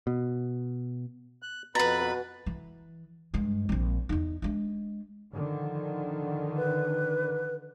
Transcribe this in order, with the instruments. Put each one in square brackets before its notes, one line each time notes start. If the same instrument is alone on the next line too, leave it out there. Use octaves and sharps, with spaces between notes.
[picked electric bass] B2
[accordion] F#6
[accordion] F2 B5 [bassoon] B2 [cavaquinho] B4 A#5 [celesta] A6
[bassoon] B2
[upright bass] E3
G2 G#3
A#1 C4
E2 D#4
G#3 D4
[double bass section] D3 D#3 F3
[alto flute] B4